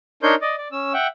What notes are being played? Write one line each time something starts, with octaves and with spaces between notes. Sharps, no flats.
D4 D#4 A#4 C#5 C6 G6
D5 D#5
D5
C#4 E6
E5 F#5 G5